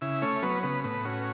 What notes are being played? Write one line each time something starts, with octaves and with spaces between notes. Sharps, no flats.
C#3 E4 E5
A3 C#4 C#5
F#3 B3 B4
C#3 B3 B4
A2 B3 B4
C#4 F#4